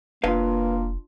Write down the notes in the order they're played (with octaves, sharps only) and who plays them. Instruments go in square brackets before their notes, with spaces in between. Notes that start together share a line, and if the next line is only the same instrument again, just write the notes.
[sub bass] F1 [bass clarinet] A#3 [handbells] D4 F4 [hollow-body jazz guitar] B4 F5